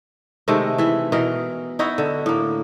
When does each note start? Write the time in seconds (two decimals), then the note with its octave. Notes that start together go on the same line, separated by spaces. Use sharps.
0.48 C3 D#3 G#3 A3
0.78 E3 E4
1.12 B2 E3 A#4
1.79 D#4 E4 F#4
1.98 D3
2.26 A2 A#3